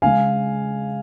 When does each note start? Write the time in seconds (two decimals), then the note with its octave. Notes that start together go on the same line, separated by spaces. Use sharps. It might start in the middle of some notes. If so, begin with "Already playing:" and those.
0.02 C#3 G#3 F5 G#5